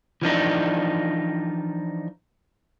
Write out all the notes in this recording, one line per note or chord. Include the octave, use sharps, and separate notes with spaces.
E3 F3 D4 D#4